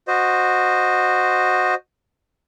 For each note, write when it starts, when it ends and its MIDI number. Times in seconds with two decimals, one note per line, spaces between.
0.08 1.74 66
0.08 1.74 72
0.08 1.74 75